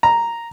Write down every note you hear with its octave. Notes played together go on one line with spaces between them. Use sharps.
A#5